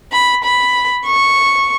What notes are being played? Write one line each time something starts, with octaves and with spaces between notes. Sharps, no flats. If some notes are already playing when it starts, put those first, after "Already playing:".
B5
B5
C#6